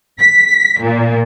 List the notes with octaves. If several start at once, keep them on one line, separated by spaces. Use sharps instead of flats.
B6
A#2